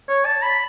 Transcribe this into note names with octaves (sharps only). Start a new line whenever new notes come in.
C#5
A5
B5